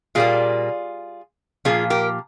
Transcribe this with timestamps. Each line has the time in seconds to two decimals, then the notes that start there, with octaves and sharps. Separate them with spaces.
0.15 A#2 G3 A#3 F4 G#4
1.65 A#2 F3 A#3 F4 G#4
1.90 G4 A#4